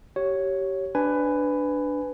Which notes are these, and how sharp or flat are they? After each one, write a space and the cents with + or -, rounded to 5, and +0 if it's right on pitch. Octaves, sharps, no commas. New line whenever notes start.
G4 -25 C#5 +0
D4 +0 B4 +15 G#5 +0